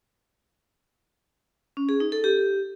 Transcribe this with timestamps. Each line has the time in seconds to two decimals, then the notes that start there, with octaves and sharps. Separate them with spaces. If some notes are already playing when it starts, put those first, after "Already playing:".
1.77 C#4
1.89 G#4
2.00 D#4
2.12 A4
2.24 G4